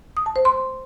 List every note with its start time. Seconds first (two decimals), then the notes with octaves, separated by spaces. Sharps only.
0.17 D#6
0.26 A5
0.36 C5
0.45 C6